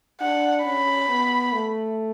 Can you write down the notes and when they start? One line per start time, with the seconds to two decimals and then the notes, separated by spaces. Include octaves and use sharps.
0.21 D4 F#5
0.65 C#4 B5
1.09 B3
1.53 A3